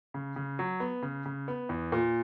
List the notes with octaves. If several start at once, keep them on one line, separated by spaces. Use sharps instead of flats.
C#3
C#3
F#3
B3
C#3
C#3
B3
E2
A#2